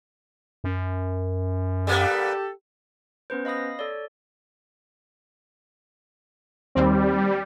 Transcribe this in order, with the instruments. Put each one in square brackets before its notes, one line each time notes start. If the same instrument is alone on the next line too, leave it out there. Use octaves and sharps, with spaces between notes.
[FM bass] F#2
[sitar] G3 A#3 B3 [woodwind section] G4 A4
[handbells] B3 C#4 B4 C5
D#5 F5 B5 D#6 A#6
A4 C#5 D5
[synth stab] D#2 C4 [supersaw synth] G3